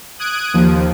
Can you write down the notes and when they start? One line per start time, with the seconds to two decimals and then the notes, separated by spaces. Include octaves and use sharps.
0.19 D#6 F#6 G#6 D7 D#7
0.53 D#2 F3